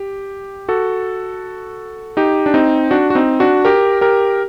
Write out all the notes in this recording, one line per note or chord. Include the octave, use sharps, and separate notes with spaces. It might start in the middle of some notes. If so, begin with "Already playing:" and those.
Already playing: G4
F#4 A4
D#4 G4
D4
C4 D#4
D4 F#4
F#4
C4 D#4
D4 F#4
G4 A#4
G4 A#4